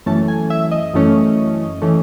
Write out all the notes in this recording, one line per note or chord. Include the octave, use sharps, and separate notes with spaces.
F#2 E3 A3 C#4 A5
G#5
E5
D#5
F#2 E3 A3 C#4
E3 A3 C#4